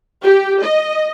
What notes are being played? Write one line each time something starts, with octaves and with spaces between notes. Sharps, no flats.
G4
D#5